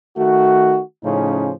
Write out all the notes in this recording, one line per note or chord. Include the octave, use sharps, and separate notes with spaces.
D#3 A3 F#4
A2 C#3 F3 C#4 D#4